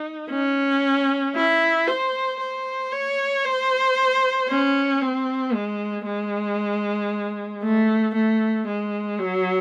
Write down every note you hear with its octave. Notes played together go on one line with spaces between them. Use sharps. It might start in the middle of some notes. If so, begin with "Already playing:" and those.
Already playing: D#4
C#4
E4
C5
C5
C#5
C5
C#4
C4
G#3
G#3
A3
A3
G#3
F#3